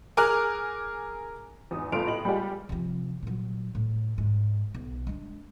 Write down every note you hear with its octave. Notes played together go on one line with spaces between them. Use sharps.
G#4 A#4 G#5 D6 F6 F#6
E2 G#2 D#6
G1 A3 F4 C6 D7 F7
A2 D#5 F#7
G3 G#3 B3 F4 G4
C3 F3
A#2 F#3
A2
G#2
B1
G#3 D4